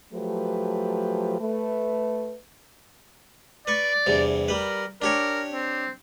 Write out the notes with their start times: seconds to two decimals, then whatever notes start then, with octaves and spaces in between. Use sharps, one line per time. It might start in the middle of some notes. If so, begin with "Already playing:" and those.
0.13 F3 F#3 A3 G4 B4
1.40 A3 B4
3.67 B4 D5 C#6
4.06 E2 G2 C3
4.48 G3 A#4 B4
5.02 D4 G4 A#4 C#5
5.52 C4